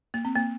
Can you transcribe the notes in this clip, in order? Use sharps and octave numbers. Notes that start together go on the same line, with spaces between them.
A#3
C4
A#3